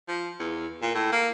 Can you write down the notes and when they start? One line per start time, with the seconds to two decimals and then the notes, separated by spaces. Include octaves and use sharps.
0.08 F3
0.40 E2
0.82 A#2
0.95 A2
1.12 A#3